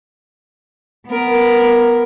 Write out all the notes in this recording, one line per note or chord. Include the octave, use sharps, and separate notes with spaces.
B3 A#4